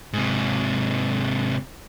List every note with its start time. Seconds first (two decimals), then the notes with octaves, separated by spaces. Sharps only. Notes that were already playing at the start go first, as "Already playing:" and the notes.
0.13 G#2 C3